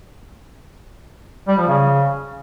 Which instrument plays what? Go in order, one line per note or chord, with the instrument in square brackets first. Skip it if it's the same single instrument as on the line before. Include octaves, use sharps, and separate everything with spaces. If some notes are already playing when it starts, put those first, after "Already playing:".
[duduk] G3
F3
C#3